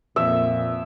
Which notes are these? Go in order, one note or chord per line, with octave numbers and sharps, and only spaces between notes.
F2 A#2 E5